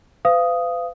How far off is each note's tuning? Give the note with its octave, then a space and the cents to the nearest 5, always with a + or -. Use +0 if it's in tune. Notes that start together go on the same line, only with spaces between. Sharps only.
B4 +45 F5 -25 D#6 +0